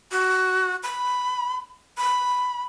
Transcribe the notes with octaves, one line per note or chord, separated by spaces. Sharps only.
F#4
B5
B5